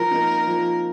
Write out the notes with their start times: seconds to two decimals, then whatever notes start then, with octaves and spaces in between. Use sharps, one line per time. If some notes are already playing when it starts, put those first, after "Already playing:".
Already playing: F3 A#4
0.11 A#3 D#4
0.47 F3